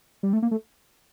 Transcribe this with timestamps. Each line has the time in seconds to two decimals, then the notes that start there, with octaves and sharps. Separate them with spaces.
0.23 G3
0.33 A3
0.42 A#3
0.51 A3